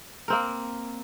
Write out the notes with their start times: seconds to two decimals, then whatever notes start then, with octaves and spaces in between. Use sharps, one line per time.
0.28 A#3 C4 A#4